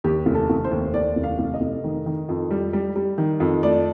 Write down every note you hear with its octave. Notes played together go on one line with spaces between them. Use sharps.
D#2 G4
F1
A4
F1
C5
D#2
D#2 D5
F1
F5
F1
D#5
F1
D#3
D#3
F2
G3
G3
G3
D#3
F2
A3 D5